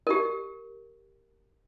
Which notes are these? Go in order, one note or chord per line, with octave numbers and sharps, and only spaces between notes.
G4 A#4